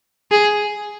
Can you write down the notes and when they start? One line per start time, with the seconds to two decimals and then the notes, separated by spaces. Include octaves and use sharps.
0.31 G#4